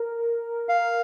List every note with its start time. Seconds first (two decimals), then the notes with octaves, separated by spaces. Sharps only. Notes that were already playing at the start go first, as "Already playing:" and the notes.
Already playing: A#4
0.69 F5